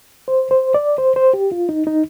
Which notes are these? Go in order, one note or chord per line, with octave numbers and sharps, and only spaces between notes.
C5
C5
D5
C5
C5
G4
F4
D#4
D#4